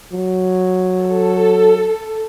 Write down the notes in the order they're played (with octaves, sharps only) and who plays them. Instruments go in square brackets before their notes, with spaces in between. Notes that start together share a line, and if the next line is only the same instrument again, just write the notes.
[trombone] F#3
[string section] A4